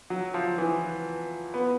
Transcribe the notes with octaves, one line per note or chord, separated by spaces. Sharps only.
F#3
F3
E3
B3